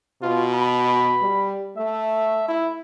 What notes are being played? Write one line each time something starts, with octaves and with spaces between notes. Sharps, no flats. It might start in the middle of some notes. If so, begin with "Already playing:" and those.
B2 F4
B5
G3
A3 E5
E4